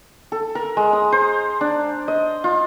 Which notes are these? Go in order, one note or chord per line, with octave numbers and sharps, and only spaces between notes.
A4
A#4
G#3
D#6
C5
D4
D#5
F4